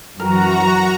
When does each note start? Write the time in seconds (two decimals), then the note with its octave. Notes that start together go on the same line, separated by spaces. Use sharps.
0.20 F#2 E3 F#3 F#4 A#4 A#5